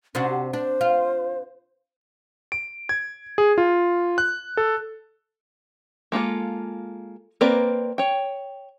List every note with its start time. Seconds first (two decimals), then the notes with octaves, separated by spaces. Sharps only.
0.15 C3 C#4 D4 F#4
0.29 G4
0.53 D4 C5
0.81 F4
2.52 D7
2.89 G#6
3.38 G#4
3.58 F4
4.18 F#6
4.57 A4
6.12 G#3 A#3 F4 A4
7.41 A#3 C4 A#4 B4 D5
7.98 C#5 G5